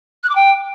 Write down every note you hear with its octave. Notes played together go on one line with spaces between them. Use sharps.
F#6
D6
G5